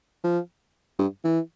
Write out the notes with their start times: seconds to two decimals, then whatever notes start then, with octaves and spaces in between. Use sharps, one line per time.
0.24 F3
0.99 G2
1.24 E3